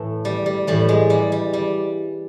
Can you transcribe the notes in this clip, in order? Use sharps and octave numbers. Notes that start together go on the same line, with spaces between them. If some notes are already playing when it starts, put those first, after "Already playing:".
Already playing: A2 E3 A3
G3
G3
A2 E3 G3
G#3
G3
G3
G3